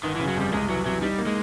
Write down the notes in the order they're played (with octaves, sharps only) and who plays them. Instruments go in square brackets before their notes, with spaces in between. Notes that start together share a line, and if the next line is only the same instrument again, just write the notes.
[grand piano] G1 [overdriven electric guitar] D#3
[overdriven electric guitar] E3
[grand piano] C#3
[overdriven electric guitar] F#3
[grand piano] F2 [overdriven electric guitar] G3
[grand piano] C2 [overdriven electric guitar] G#3
[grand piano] E3 [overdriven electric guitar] F#3
[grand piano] C3 [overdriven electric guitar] F#3
[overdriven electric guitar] G3 [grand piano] D#4
[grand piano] A#3
[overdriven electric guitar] G#3